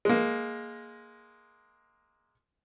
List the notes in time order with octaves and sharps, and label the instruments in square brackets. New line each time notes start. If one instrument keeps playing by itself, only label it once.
[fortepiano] G#3 A#3